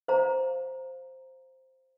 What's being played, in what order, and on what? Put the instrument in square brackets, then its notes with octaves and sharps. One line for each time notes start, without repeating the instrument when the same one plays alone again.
[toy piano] C5 F5 A#5